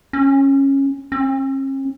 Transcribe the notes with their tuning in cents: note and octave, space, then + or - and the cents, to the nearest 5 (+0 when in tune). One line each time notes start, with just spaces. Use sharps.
C#4 -15
C#4 -45